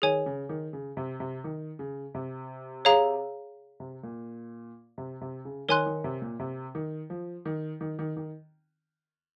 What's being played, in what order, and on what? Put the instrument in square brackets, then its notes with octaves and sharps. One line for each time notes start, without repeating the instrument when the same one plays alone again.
[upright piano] D#3 [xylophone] G#4 C#5 G#5
[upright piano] C#3
D#3
C#3
C3
C3
D#3
C#3
C3
[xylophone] G#4 C#5 F5 A#5
[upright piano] C3
A#2
C3
C3
C#3
[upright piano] D#3 [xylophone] A#4 C#5 G#5 C6 F#6
[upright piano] D#3
C3
A#2
C3
D#3
F3
D#3
D#3
D#3
D#3